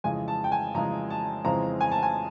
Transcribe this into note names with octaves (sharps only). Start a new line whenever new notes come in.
F2 C#3 E3 G#3 G#5
A5
G5
G#5
F2 C#3 E3 G#3 A#5
A5
F2 C#3 E3 G#3 C4 A#5
G#5
A5
G#5